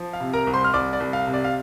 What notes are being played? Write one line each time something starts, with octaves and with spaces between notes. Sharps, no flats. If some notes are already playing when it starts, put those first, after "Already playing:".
Already playing: F3
F5
C3
A#4 A#5
C2
C5 C6
F6
C2 D5 D6
D5
C2
F5
C3
D5
F5